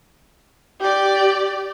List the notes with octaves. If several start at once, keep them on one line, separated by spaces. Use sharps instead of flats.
G4 D5